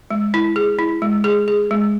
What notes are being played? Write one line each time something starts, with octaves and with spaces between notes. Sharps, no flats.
G#3
E4
G#4
E4
G#3
G#4
G#4
G#3